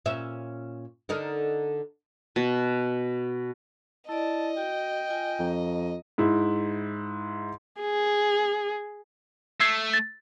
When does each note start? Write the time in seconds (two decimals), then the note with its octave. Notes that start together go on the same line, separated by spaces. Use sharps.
0.05 A#2 C#4 E5
1.09 D3 D#4 A#4
2.36 B2
4.09 E4 D5 D#5 A5
4.57 F#4 G5
5.10 F4 G#5
5.39 F2 A#5
6.18 G#2 E4
7.81 G#4
9.60 A3 E6 G#6 C7
9.94 A6